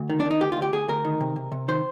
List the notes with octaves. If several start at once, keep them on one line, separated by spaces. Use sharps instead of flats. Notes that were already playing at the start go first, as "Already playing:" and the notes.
Already playing: D2
D#3
D4
D#3
D#4
D2 G4
F4
D2
G4
D2 G#4
D2 A#4
D#3
C3
C3
C3
D#3 C5